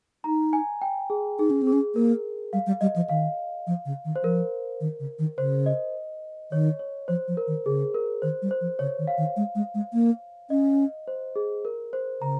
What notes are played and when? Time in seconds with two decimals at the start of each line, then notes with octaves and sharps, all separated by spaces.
0.24 D#4 A#5
0.53 G#5
0.82 G5
1.10 G#4
1.39 D#4 G#4
1.50 C#4
1.62 C4
1.67 G#4
1.72 C#4
1.95 A#3 A#4
2.53 G3 F5
2.66 G3
2.81 G3 D#5
2.96 F3
3.09 D#3 F5
3.67 F3
3.85 C#3
4.05 D#3
4.16 C5
4.23 F3 A#4
4.80 D#3
4.99 C#3
5.19 D#3
5.38 C#3 C5
5.66 D#5
6.51 D#3 C#5
6.79 C#5
7.08 F3 C5
7.28 F3
7.37 A#4
7.47 D#3
7.66 C#3 G#4
7.94 A#4
8.22 D#3 C5
8.42 G3
8.51 C5
8.61 F3
8.79 C#3 C#5
8.98 D#3
9.07 F5
9.18 D#3
9.36 G#3
9.55 G#3
9.74 G#3
9.93 A#3
10.50 C#4 D#5
11.08 C5
11.36 G#4
11.65 A#4
11.93 C5
12.21 C#3 A#5